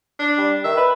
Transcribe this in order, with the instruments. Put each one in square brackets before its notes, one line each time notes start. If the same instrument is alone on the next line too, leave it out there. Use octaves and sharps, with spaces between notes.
[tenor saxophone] D4
[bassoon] G3
[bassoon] D#3 [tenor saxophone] E5
[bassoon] B4